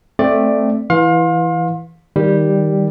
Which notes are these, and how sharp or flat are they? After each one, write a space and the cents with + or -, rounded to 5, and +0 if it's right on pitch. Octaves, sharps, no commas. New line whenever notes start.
A3 +0 C4 +0 D5 +10
E3 -5 F5 +30 C6 +30
D#3 +0 G3 +0